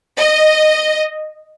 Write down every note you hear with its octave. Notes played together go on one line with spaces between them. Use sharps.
D#5